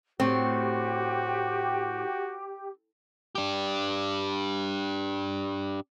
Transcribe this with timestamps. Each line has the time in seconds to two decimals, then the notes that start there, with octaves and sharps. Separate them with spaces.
0.20 A2 C4 F#4 G4
3.35 D4 G4